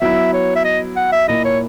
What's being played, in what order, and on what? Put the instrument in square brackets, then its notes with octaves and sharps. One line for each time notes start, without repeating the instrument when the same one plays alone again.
[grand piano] F#3 B3 E4 [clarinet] E5
[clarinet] C#5
E5
D#5
F#5
E5
[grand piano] A#2 A#3 E4 [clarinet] D#5
[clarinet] C#5